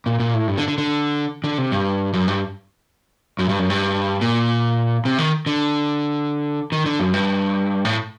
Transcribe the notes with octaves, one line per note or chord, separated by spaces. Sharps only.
A#2
A#2
A2
G2
D3
D3
D3
D3
C3
G2
F#2
G2
F#2
G2
F#2
G2
A#2
C3
D#3
D3
D#3
D3
F#2
G2
A2